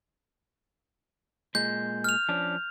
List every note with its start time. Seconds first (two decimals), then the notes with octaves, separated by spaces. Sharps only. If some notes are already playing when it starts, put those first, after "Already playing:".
1.55 A#2 G#3 G6
2.04 F6 F7
2.29 F3 C#4 D4